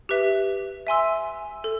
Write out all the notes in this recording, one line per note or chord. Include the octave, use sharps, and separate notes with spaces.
G4 B4 E5
E5 G#5 C6 E6
A4